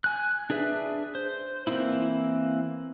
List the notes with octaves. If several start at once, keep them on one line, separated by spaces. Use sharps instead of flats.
G#5 F#6
D4 G#4 B4 E5
C5
E3 A#3 C4 D#4 E4